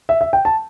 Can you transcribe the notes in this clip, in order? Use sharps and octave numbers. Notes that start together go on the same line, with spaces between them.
E5
E5
G5
A5